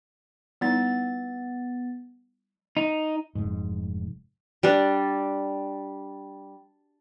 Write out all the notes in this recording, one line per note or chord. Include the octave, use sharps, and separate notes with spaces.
G3 B3 D#4 E4 A6
D#4
F1 G#2
G3 D4